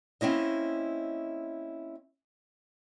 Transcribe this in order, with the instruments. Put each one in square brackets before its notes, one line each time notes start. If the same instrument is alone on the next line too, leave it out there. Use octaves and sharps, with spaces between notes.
[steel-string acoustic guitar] A#3 C4 C#4 E4 D#5